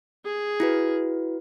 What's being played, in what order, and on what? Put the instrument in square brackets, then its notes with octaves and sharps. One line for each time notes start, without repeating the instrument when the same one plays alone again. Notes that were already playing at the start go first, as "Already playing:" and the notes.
[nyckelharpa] G#4
[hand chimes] E4 F#4 B4